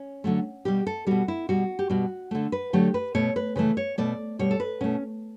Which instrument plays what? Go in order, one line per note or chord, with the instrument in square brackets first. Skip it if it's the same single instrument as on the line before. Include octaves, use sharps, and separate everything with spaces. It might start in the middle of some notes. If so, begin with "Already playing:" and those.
Already playing: [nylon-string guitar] C#4
D3 F#3 A3
B2 G3 G4
A4
B2 G3 F#4
E4
B2 G3 F#4
G4
B2 G3 F#4
D3 A3
B4
D3 F#3 A3 G4
B4
B2 A3 C#5
B4
C#3 E3 A3 B4
C#5
B2 A3 D5
B2 G3 C#5
A4
B4
B2 A3 C#4